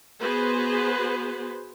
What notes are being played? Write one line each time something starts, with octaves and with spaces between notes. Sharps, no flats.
B3 F#4 G#4 B4 C5